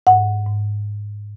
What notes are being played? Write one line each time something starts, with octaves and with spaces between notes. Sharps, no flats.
G#2 F#5
G#2